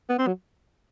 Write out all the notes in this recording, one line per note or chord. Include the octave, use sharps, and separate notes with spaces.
B3
C4
F#3